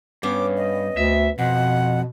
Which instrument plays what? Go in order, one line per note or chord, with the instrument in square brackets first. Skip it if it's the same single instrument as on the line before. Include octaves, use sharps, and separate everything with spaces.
[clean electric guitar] G2 [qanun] B3 C#4 [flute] D6
[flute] D#5
[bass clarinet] D2 [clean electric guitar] E5
[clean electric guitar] F2 [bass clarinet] B2 [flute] F#5